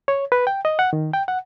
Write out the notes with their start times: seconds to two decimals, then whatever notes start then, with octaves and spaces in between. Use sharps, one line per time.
0.08 C#5
0.32 B4
0.47 G5
0.65 D#5
0.79 F#5
0.93 D#3
1.14 G5
1.28 F#5